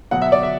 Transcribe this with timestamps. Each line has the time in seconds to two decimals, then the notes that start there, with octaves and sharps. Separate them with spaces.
0.11 B2 F#3 F#5
0.22 E5
0.32 D5
0.43 E5